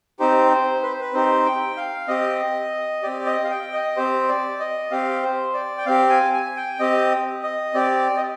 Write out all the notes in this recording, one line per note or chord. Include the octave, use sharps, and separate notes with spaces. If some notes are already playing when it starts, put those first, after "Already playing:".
C4 D#4 G4 C5
C5
B4
C5
B4
C4 D#4 G4 C5
G5
F5
C4 G4 D#5
C4 G4 D5
D#5
F5
G5
D#5
C4 G4 C5
D5
D#5
C4 G4 F5
C5
D5
G5
C4 G4 F5
G#5
G#5
G5
C4 G4 D#5
D#5
C4 G4 D5
D#5